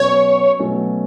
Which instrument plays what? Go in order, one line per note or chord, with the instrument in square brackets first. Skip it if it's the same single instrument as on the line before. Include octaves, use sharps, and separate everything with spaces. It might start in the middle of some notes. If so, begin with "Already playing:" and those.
Already playing: [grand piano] B2 F#3 C#4 [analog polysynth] C#5
[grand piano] B2 F#3 A3 C#4